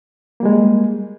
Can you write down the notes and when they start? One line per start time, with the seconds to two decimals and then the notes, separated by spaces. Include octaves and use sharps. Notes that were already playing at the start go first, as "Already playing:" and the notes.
0.40 A#3
0.43 G3
0.45 G#3